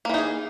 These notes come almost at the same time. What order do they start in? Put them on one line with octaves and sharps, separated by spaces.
A#3 E3 D#4 G#4